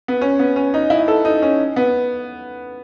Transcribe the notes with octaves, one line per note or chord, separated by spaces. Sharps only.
B3
C#4
B3
C#4
D#4
E4
A4
D#4
C#4
B3